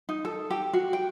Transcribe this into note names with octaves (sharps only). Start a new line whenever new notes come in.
D#4
A4
G4
F#4
G5